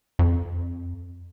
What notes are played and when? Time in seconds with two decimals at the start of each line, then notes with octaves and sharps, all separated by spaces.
0.19 F2